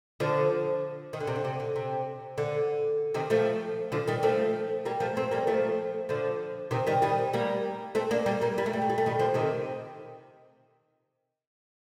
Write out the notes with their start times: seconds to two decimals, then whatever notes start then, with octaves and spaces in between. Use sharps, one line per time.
0.20 D3 F3
1.13 D#3
1.20 D3
1.27 C3
1.36 D3
1.45 C3
1.60 D3
1.76 C3
2.38 D3
3.14 C3 D#3
3.30 F3 A3
3.92 D3 F3
4.08 D#3 G3
4.23 F3 A3
4.85 G3 A#3
5.00 F3 A3
5.16 A3 C4
5.31 G3 A#3
5.47 F3 A3
6.09 D3 F3
6.71 C3 D#3
6.87 D#3 G3
7.02 D#3 G3
7.33 G3 A#3
7.95 A3 C4
8.11 A#3 D4
8.26 G3 A#3
8.41 G3 A#3
8.58 G3
8.66 A3
8.73 G3
8.82 A3
8.90 G3
8.98 A3
9.06 D#3 G3
9.19 D3 F3
9.34 C3 D#3